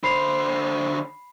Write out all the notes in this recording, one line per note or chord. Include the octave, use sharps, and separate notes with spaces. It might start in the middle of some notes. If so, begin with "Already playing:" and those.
D3 C5 B5 C7 F7